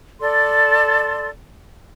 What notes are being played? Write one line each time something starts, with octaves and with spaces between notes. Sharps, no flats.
A4 D5 C6